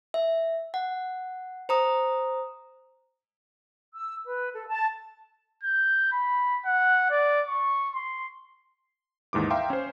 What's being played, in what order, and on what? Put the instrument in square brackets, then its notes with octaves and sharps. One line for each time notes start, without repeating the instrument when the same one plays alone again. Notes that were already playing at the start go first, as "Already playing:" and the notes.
[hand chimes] E5
F#5
C5 A#5 D#6
[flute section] E6
B4
A4
A5
[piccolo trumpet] G6
B5
F#5
D5
C#6
C6
[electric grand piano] D#2 G#2 E3 D6
E5 F5 G5 A#5 C6 D6
C#4 C5